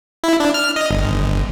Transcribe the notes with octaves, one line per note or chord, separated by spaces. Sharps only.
E4
D4
F6
D#5
G1